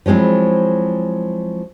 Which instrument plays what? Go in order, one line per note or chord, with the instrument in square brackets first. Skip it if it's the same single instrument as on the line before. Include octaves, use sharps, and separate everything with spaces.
[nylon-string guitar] F3 F#3 G#3 C4 E4